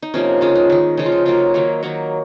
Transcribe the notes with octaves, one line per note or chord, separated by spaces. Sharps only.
D#4
C3 F3 A#3 C#4
C#3 F3 G#3 F4
D#4
D#3 G#3
C#3 F3 G#3 D#4
F4
D#4
C#3 F#3 A#3 F4
D#3 F#3 A#3 D#4
D#3 F#3 A#3 F#4